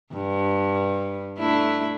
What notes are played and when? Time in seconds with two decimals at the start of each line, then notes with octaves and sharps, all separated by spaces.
0.14 G2
1.39 A3 D4 E4